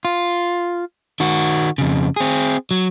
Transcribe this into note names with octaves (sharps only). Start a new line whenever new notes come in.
F4
D#3 F#4
F2 C#3
C4 G#4
F#3